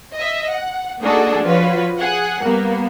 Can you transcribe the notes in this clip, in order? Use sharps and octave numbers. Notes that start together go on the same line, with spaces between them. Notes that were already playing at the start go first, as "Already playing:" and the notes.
D#5 E5
F#5
A#3 D4 D#4 F#4 G#4 A4
F3 F4 F#4 B4 C#5
G#4 F#5
G3 A#3 B3